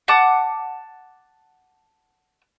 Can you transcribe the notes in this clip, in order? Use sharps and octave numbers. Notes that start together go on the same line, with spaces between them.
F#5 A5 D6